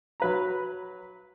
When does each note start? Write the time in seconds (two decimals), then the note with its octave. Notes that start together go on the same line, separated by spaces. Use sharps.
0.20 F#3 B4 A#5